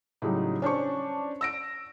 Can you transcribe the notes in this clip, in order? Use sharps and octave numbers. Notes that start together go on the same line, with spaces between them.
A2 C#3 F#3 G3 D#4
C#4 D4 C5 C#6
E6 A#6 D7